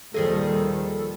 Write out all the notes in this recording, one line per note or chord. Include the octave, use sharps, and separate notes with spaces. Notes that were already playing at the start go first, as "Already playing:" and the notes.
D#2 A#2 D#3 F3 G3 G#4 A4 D#5